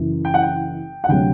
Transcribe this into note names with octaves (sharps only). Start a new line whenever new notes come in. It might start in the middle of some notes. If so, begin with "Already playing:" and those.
Already playing: F#1 F#2 E3
G5
F#5
G5
F#5
D2 C3 F#3 G5